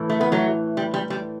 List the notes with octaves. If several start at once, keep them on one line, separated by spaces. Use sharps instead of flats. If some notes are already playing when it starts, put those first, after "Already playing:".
Already playing: A2 E3
A3
B3
F#3 A3
G3
G3
G3